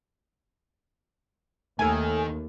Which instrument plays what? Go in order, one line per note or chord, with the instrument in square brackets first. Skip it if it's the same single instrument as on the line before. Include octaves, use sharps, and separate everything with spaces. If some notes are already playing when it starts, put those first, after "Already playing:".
[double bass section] D#2 [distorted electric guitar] D#3 [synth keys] A3 A4 [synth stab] G#5